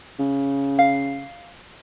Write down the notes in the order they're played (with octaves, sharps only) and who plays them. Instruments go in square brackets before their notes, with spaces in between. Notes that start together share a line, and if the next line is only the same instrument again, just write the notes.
[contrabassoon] C#3
[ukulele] F5